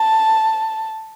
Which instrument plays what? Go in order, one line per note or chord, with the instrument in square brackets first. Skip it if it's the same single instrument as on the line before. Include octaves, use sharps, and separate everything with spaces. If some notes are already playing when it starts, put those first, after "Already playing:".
Already playing: [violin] A5